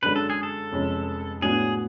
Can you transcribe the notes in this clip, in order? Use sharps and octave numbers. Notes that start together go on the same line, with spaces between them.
F#2 D3 G#3 D4 B4
A4
G#4
A4
F1 F2 C#3 G#3 C#4
A2 F#3 B3 D4 F#4 G#4